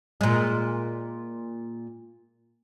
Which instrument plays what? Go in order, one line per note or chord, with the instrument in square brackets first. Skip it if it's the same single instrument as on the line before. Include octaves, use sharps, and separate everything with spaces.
[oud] A#2 G#3